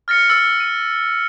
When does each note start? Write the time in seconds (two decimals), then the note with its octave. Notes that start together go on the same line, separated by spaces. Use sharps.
0.08 F6 A6 A#6 C#7
0.30 E6 A6
0.60 D#7